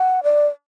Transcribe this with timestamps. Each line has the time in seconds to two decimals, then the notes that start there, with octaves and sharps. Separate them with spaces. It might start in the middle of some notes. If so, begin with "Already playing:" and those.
Already playing: F#5
0.23 D5